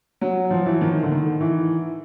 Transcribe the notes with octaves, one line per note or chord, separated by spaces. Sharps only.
F#3
F3
E3
D#3
D3
D#3
E3